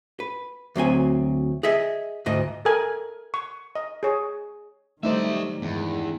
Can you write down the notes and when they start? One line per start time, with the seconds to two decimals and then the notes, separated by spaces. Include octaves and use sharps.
0.20 B4
0.76 D2 F#3 C4 G#5
1.63 G#4 D#5 E5
2.26 D2 G#2 D#5
2.65 A4 A#4 G#5
3.34 C#6
3.75 D#5
4.03 G#4 C#5
5.03 D#3 F#3 G3 A3 D#4 C5 D5 E5
5.62 E2 G2 D#3 G#3